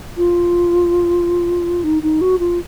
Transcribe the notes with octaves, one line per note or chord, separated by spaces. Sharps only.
F4
D#4
D#4
F#4
F4